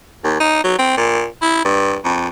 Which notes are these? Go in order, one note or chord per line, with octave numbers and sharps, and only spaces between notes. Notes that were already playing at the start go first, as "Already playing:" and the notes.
D#2
D#4
F#3
C4
A#2
E4
G2
F2